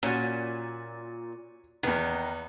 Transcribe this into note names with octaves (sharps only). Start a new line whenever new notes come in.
A#2 C#4 F#4
E2 D#3 B3